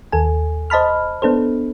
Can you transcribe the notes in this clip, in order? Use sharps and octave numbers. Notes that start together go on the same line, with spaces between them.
D#2 A4 G#5
C5 D#5 A5 B5 F6
B3 D4 A4 C5